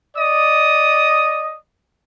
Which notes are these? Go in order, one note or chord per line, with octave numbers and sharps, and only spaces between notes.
D5 D#5 D#6